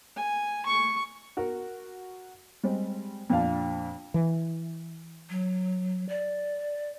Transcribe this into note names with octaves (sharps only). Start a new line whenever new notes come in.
G#5
C#6
F#4 A#4
G3 G#3 C4
F2 A#2 D4 F5 A5
E3
F#3
D5